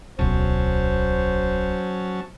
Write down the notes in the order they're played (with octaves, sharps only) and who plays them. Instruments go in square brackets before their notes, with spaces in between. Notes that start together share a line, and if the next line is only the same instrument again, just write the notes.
[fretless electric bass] D1 B1 [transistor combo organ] F#3 C#4 A5 [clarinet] C5